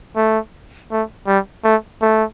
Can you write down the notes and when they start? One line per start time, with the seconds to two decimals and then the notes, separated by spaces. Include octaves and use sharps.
0.16 A3
0.91 A3
1.27 G3
1.64 A3
2.02 A3